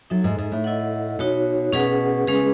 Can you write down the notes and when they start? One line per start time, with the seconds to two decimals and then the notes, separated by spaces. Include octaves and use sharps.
0.10 F#3 D#4 A4 E5
0.24 G#2
0.38 G#2
0.52 A2
0.64 E4 A4 D#5 F#5
1.19 B2 D#4 F#4 C#5
1.73 B2 C#4 G#4 B4 F#5
2.27 C#3 G#3 C#4 G#4 B4